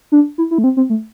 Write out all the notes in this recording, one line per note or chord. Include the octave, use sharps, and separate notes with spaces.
D4
E4
E4
A3
C4
C4
A3